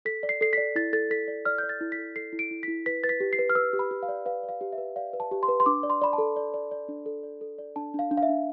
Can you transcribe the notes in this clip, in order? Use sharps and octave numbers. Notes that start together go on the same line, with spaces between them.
A4 B6
D5
C7
A4 C7
B6
D5
E4 A6
A4 A6
A4 B6
D5
D5 F6
D5 G6
A6
E4
B6
A4
A4 C7
E4
D7
E4
B6
E4
B4 B6
B4 A6
B6
G4
C7
B4
F6
B4 E6
G4
B5
G4
F5
D5
B4 F5
D5
F5
G4
E5
B4
D5 F5
B4
A5
G4
C6
B4
C6
D4 D6
D5
C6
D5 B5
A5
A4
D5
D5
D5
D4
A4
D5
A4
D5
D4 A5
D4
F5
D4
F5
E5
D4